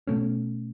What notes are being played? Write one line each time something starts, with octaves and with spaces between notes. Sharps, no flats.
B2 A3 C#4